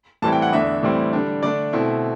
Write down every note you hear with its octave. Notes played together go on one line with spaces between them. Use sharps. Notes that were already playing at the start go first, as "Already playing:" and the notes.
A2 E3 G3 C4 E4 A5
G5
F#5
E2 D3 A3 D4 E5
A2 E3 G3 C4 E4
D3 G3 D4
D3 A3 D4 D5
B2 A3 C4 E4